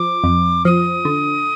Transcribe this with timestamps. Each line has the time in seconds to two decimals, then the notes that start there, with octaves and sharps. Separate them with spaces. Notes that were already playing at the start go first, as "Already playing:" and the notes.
Already playing: F3 D6
0.24 F2
0.65 F3 D#6
1.05 D3